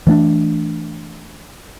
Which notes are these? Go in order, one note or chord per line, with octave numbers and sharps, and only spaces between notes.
E3 A3 C#4 D4